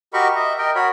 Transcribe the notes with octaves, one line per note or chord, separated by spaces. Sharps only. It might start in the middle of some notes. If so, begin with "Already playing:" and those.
F#4 G4 A#4 D#5 B5 C#6
D#5 E5
A#4 D#5 G5
F#4 A#4 C#5 B5